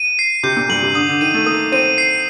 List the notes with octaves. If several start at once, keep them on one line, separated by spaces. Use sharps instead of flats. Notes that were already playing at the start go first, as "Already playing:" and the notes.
Already playing: D#7
C7
C3 G6
A#2
G2 F#7
C3
D3 D#6
D3
D#3 D#7
A3
A#3 D#6
C4 D#7
C7